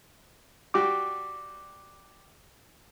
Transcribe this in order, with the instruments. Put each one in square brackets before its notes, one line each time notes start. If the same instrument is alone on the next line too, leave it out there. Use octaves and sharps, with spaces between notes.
[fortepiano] G3 F#4 G4 [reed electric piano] D6